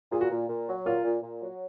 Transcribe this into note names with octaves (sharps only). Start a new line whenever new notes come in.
A#2 G#4
F#4
A#2
A#2
F#3
A#2 F4
A#2
A#2
F#3